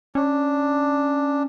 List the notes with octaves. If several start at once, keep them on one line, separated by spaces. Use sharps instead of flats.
C#4 D4